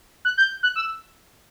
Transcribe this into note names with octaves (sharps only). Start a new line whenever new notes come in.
F#6
G6
F#6
E6